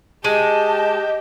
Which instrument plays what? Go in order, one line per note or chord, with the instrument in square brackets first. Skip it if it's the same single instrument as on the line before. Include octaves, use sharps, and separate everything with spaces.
[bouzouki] G#3 [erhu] G4 [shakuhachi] D#5 [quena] A5